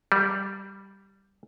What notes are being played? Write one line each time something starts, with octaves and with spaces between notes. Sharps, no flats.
G3